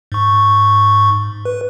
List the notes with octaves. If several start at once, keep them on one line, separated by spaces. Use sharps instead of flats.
G#2 C#6
B4